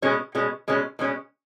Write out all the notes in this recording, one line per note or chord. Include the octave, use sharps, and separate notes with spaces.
B2 G#3 C#4
B2 G#3 C#4
B2 G#3 C#4
B2 G#3 C#4